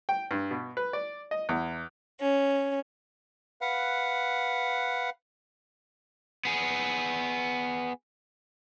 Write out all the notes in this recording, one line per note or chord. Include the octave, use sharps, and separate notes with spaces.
G5
G2
B2
B4
D5
D#5
E2
C#4
B4 F5 F#5
B3 G#4